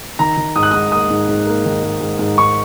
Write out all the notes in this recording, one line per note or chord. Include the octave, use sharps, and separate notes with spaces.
D#3 A#5
D#3
G#2 D#6
F#6
G#2 D#6
A#3 D#6
G#2
G#2
A#3
D#3
G#2
G#2
G#2
G#2 C#6